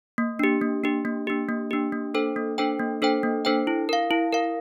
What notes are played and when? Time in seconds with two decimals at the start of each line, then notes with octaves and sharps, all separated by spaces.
0.18 A#3
0.39 D4 G4
0.61 A#3
0.84 D4 G4
1.05 A#3
1.27 D4 G4
1.49 A#3
1.71 D4 G4
1.92 A#3
2.14 D4 A4 C5 G5
2.36 A#3
2.58 D4 A4 C5 G5
2.79 A#3
3.02 D4 A4 C5 G5
3.23 A#3
3.45 D4 A4 C5 G5
3.67 E4
3.89 A#4 F5
4.11 E4
4.33 A#4 F5